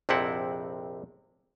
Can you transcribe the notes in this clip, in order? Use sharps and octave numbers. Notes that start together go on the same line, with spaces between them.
A#1 F2 C3 C4 E4 F#5